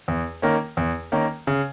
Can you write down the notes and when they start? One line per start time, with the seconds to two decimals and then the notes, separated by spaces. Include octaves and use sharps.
0.08 E2
0.42 D#3 A#3 C#4
0.77 E2
1.12 D#3 A#3 C#4
1.47 C#3